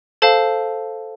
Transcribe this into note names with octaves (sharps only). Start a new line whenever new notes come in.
A4 C5 F5 A5